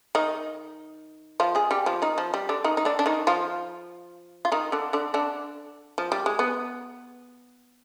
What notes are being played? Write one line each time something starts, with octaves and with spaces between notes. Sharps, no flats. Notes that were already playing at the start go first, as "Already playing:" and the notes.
D#3 D#4
F3 F4
G#3 G#4
G3 G4
F3 F4
D#3 D#4
F3
G3
D3 D4
D#3 D#4
D#4
D3 D4
D4
D#3 D#4
F3 F4
F4
D#3 D#4
D3 D4
D3 D4
D3 D4
F3
G3
G#3
B3